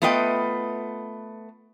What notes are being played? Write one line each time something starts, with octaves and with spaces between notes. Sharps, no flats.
A3 B3 F4 B4 D#5 G5